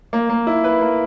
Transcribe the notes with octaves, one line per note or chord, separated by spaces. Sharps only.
A#3
A#3
E4
B4
A#3